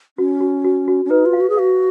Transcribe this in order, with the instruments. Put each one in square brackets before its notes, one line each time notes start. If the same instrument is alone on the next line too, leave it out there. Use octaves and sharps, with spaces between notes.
[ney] C#4 [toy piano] F#4
[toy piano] F#4
F#4
F#4
[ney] C#4
[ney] D#4 [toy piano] B4
[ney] F4
[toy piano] F5
[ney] F#4
G#4
[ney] F#4 [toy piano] F5